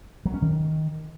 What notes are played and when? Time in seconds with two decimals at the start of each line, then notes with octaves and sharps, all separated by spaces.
0.25 F#3
0.34 C#4
0.42 D#3